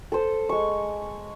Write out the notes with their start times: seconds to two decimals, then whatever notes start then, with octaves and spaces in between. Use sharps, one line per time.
0.12 A4 C5
0.49 G#3 C#6